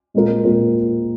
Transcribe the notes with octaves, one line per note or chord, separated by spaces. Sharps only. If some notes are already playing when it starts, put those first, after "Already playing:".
A#2 G#3 C4 F4 A#4
A#2 G#3 C4 F4 A#4